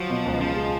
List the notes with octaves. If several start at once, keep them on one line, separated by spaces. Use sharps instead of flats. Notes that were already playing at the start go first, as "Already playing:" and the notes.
Already playing: F3 F#3
B2
C#2
C#3 F3
G#3